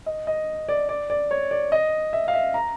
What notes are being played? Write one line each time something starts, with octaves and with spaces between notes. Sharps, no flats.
D#5
D#5
D5
D5
D5
C#5
D5
D#5
E5
F5
E5
A#5